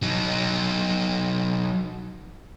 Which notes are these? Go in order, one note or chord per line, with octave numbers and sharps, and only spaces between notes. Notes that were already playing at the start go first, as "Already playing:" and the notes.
F#3 D#4